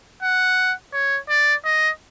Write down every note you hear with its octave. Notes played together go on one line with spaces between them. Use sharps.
F#5
C#5
D5
D#5